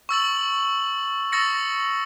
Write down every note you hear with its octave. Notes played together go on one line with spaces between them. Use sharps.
C#6 E6 A6 F#7
C#6 D#6 E6 A6 A#6 C#7